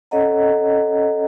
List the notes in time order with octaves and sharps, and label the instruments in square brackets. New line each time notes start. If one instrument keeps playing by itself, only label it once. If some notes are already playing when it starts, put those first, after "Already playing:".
[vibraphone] C#4 A4 C#5 D#5 F#5 A#5